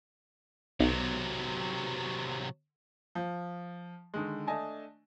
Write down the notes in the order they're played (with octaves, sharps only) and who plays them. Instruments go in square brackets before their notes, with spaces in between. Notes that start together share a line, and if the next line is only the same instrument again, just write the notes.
[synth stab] B1 [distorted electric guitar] C3 F#3
[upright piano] F3
D3 D#3 G#3
A3 D4 D#5 G#5 A5